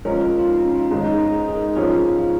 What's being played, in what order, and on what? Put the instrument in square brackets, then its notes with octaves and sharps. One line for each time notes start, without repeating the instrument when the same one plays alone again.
[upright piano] F3 G#3 C#4 A#4 C#5 [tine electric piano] F4
[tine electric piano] F4
D#4
C#4
D#4
F4
D#4
[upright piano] G#2 D#3 G#3 C#4 G#4 [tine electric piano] D#4
[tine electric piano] D#4
D#4
G#4
G#4
A#4
[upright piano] G#2 F3 C#4 F4 [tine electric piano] G#4
[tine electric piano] F4